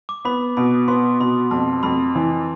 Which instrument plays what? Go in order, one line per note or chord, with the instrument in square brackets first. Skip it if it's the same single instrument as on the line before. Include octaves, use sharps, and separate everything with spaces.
[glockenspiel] D6
[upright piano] B3 [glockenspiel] B5
[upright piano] B2 [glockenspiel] B5
[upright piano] B3 [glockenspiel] C6
[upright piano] B2 [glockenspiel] B5
[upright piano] F2 [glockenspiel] A5
[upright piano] F2 [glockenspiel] B5
[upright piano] E3